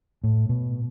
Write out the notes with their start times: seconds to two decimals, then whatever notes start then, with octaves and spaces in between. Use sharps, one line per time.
0.24 A2
0.49 B2